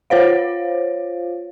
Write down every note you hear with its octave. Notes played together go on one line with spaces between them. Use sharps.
F4 C5 C#5 F5